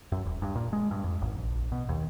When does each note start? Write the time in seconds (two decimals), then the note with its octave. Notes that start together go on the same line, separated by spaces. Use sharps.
0.12 F#2
0.25 D#1
0.42 G2
0.56 A#2
0.73 G#3
0.91 G2
1.04 F2
1.22 G#1
1.37 A#1
1.72 B2
1.89 D#2